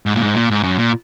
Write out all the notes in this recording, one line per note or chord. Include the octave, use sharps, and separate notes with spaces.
G#2
A#2
G#2
A#2
G#2
F#2
A#2